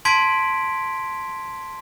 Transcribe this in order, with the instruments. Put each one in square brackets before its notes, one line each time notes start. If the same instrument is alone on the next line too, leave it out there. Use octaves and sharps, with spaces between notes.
[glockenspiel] A5 C6 G#6 B6 D7 F#7